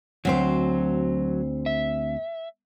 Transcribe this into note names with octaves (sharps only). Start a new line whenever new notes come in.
D2 F#3 C4 C5
E5